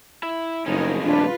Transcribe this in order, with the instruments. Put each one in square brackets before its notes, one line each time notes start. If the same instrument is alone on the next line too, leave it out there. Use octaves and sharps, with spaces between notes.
[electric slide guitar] E4 E5
[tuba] F#1 [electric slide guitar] F2 A2 C#4 [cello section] D#4 G#4 A#4
[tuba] D#1 [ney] D4 [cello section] F4 B4